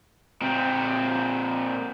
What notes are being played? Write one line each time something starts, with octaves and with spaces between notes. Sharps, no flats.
A#2 C4